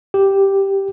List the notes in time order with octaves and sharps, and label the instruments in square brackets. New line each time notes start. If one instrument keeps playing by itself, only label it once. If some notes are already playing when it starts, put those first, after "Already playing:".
[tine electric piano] G4